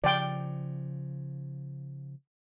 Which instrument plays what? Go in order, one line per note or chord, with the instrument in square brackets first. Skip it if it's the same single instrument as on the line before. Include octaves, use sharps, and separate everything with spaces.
[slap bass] C#3 F3 [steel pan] D5 G5